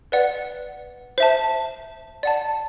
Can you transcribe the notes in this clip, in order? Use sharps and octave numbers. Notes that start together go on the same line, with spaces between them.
B4 D5 F#5
C5 E5 A5
D5 F#5 A5